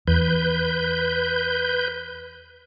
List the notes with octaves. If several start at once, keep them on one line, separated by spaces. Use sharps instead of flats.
E2 B4 G6